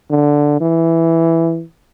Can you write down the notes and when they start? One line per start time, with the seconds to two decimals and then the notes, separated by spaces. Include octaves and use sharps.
0.11 D3
0.60 E3